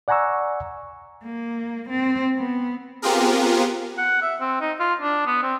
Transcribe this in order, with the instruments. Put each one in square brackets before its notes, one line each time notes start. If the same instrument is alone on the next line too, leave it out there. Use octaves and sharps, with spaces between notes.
[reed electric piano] D5 F#5 G#5 A#5 C#6 E6
[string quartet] A#3
C4
B3
[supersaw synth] B3 C4 F4 G4 G#4 A#4
[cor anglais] F#5
E5
C4
D#4
F4
D4
B3
C4